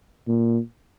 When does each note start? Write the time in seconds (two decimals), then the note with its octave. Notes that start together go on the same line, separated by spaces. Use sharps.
0.28 A#2